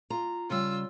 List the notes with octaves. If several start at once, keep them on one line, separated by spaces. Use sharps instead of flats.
F4 A#5
C#3 G3 F4 E6